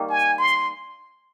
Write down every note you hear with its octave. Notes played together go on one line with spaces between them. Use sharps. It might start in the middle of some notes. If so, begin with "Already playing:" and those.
Already playing: D#3 G3 A#3
G#5
C6